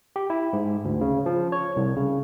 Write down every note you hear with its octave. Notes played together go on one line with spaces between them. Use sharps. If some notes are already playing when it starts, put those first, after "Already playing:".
G4
E4
G#2
D2
C#3
F3
C#5
C2
C#3